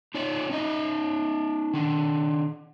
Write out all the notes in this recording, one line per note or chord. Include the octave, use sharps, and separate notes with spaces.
D#4 F4 C#5 D5
C#4 D#4 D#5
D#3 D4